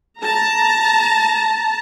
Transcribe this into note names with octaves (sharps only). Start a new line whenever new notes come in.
A5 A#5